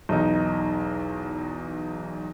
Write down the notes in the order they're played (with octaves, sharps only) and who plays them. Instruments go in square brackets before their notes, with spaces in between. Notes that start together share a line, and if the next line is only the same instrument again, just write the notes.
[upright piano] B1 E2 D#4